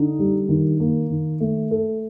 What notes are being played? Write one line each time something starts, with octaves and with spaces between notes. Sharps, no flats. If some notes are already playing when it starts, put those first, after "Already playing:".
Already playing: D3 D#4
G3
D#3
A#3
D#3
A3
A4